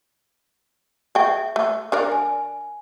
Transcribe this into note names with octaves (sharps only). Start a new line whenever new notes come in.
G#4 E5 G5 C#6
A3
D4 A#4 D5
G#5